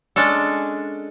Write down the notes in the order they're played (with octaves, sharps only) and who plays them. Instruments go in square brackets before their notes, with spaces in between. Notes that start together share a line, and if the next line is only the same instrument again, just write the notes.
[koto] G#3 C#4 D4 A4